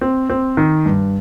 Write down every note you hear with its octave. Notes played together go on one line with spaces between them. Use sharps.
C4
C4
D#3
G2